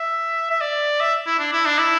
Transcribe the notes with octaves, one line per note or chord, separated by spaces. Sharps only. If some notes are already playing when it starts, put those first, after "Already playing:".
Already playing: E5
E5
D5
E5
E4
D4
E4
D4
E4